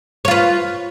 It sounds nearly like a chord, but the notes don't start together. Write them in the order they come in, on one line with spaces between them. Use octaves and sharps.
C#5 F4 B4